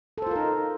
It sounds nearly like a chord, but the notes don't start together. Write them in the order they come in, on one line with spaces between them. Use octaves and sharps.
A4 C5 F4 A#4 D#4